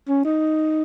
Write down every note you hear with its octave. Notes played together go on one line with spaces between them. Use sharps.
C#4
D#4